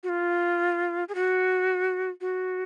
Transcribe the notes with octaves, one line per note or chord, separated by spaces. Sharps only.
F#4
F4
G#4
F#4
F#4